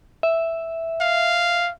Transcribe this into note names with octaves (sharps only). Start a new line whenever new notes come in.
E5
F5